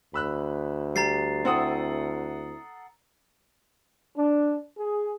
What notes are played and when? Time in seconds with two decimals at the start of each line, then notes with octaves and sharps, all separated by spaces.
0.14 D2 B5 E6 F#6
0.96 G3 A#5 A6 C7
1.45 C4 E4 A4 F#5 D#6
4.18 D4
4.78 G#4